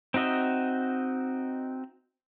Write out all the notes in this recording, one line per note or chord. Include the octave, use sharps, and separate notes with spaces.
C4 D#4 F#4 D#5 E5